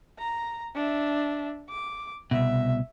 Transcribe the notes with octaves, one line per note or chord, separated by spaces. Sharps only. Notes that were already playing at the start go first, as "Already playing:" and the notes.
A#5
D4 E5
D6
C2 B2 E5